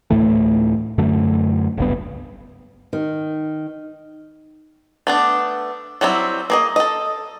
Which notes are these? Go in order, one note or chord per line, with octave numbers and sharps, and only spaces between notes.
D2 A2 E3 A3
F#2 D3 F#3 A3
F#1 C#2 G2 B3
D#3
A3 B3 D4
F#3 G3 C4 E4
A#3 G#4 D#5
A4 D#5